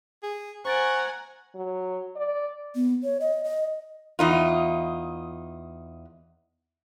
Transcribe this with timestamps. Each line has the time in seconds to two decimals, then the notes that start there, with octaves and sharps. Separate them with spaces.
0.23 G#4
0.65 C5 F#5 G#5 A#5 C#6 A6 D7
1.55 F#3
2.16 D5
2.76 B3
3.04 C#5
3.20 D#5
3.44 D#5
4.19 E2 D#4 F4